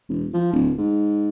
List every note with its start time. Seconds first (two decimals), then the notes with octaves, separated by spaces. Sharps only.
0.09 E1
0.34 F3
0.53 D1
0.78 G#2